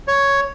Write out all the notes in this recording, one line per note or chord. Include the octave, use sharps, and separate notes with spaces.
C#5